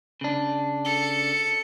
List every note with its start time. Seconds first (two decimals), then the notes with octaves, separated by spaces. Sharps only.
0.21 C#3 D4
0.85 A4 C#7